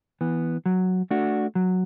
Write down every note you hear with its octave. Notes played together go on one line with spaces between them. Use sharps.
E3 B3
F#3
A3 D4 F#4
F#3